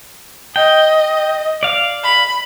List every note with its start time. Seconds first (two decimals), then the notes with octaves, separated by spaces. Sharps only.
0.56 D#5 G5
1.63 D5 F5
2.04 B5